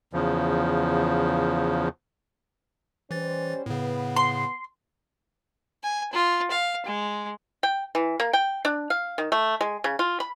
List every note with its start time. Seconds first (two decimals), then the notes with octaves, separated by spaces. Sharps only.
0.13 E2 C#3 F3
3.11 E3 G3 C#4 C5 A6
3.66 A2 C#3 B3
4.17 C6
5.84 G#5
6.13 F4
6.51 F5
6.86 G#3
7.63 G5
7.95 E3
8.20 A#3
8.33 G5
8.65 D4
8.90 F5
9.18 D#3
9.32 A3
9.61 G#3
9.84 C#3
9.99 F4
10.20 B5